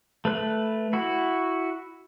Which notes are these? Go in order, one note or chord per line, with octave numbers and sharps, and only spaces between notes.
A3 B4 F#6
E4 F#4